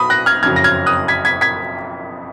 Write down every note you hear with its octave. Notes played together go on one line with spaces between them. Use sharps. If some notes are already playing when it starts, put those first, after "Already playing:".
Already playing: B1 B2 B5 D#6
F#6 A#6
F6 G#6
F#1 F2 C#3 F#3 F6 G#6
A#6
F6 G#6
D#6 F#6
G#6 B6
G#6 B6
G#6 B6